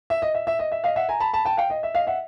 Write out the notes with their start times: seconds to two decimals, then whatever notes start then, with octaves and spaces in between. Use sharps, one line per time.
0.10 E5
0.22 D#5
0.34 E5
0.47 E5
0.59 D#5
0.72 E5
0.84 D#5 F5
0.96 E5 F#5
1.09 G#5 A#5
1.20 A5 B5
1.33 A5 B5
1.45 G5 A5
1.57 F5 G5
1.70 D#5
1.83 E5
1.95 D#5 F5
2.07 E5 F#5